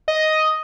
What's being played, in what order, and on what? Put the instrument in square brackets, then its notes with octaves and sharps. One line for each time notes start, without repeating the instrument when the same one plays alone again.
[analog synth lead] D#5